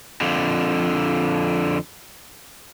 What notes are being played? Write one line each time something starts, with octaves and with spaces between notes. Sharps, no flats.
F2 D3